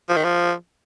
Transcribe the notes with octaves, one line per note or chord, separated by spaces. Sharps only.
F3
D#3
F3